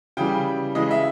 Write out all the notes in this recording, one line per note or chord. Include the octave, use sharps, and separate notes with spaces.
C#3 E3 G3 G5
C#3 E3 G#3 D#5
E5